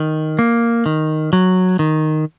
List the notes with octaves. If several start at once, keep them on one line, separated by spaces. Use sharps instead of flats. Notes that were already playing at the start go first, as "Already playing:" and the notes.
Already playing: D#3
A#3
D#3
F#3
D#3